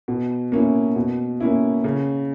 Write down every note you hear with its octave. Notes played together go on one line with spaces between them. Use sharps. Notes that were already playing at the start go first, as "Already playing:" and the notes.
B2
A#3 C#4 E4
B2
A#3 C#4 E4
C#3